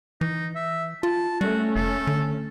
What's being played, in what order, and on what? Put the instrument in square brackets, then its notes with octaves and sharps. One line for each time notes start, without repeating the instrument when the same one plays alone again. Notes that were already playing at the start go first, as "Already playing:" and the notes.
[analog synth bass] E3 [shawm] D#4
[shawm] E5
[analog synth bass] F4 [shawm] A5
[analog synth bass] G3 [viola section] A3 C#4 [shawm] F#4
[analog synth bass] F1 [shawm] A4
[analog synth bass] D3